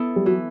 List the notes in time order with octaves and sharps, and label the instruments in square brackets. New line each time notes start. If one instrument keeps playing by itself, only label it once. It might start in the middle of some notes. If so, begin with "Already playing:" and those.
Already playing: [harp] B3 E4 A4
[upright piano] G3
[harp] E3 [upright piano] F#3